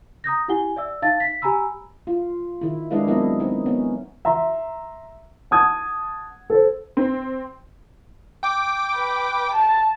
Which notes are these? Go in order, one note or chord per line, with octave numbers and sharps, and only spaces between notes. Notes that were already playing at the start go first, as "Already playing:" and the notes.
A#5 D#6 G6 A#6
E4 G4 F#5 G#5 G7
D5 E5 E6
D#4 E5 F5 A5 A6
B6
G4 G#5 A#5 B5 E6
F4
D#3 E4
G#3 D4 E4 B4 D#5 F5
F#3 B3 C4 E4 A#4 D#5
C4 D#4
B3 C#4
E5 A#5 C6
F#5 A5 D#6 G#6
A4 C5
C4
G5 D6
B4
A5